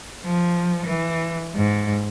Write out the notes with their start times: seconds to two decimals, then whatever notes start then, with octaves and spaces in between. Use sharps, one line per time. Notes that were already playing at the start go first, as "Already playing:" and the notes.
0.25 F3
0.86 E3
1.55 G#2